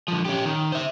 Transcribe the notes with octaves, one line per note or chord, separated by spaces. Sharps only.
D3 F3
C#4 G4
D#3
C5 E5